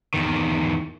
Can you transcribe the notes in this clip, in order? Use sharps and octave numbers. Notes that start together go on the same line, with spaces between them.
E2 D#3